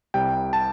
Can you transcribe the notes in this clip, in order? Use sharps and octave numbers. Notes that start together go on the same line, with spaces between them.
C2 C3 G3 G5
A5